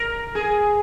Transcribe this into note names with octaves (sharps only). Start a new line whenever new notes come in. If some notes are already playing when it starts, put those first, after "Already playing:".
Already playing: A#4
G#4